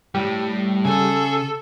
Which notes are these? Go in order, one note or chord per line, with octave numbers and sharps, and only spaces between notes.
A2 G3
C#3 G#4 A4